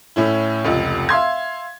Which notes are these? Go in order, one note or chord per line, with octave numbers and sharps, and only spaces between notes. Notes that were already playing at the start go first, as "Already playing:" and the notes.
A2 C#4 E4
F1 C#2
E5 F5 C6 G#6